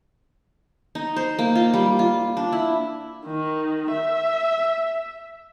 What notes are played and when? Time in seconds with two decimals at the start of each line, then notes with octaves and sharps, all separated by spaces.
0.95 D#4
1.16 C5
1.39 A#3
1.55 F4
1.74 G3
1.99 F4
2.37 D4
2.52 E4
3.27 D#3
3.92 E5